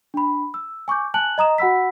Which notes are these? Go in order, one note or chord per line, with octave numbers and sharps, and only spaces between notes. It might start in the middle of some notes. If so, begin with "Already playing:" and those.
D4 B5
E6
G#5 C#6 D6 G6
G#5 A5 F#6 F#7
D#5 A#5 D#6 E7
F#4 F#5 B5 E6 B6